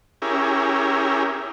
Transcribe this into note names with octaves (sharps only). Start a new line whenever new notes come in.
C#4 E4 G4 G#4 A#4